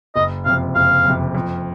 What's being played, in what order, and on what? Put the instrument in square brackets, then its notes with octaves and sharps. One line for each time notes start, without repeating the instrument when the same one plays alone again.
[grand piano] F#1 [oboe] D#5
[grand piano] F2 C3 [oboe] F5
[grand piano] F#1 [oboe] F5
[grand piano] F2 C3
F2